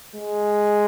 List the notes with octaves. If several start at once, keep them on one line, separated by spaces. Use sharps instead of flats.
G#3